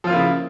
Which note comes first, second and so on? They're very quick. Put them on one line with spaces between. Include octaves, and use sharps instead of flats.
F3 F4 A#3 E4 C#3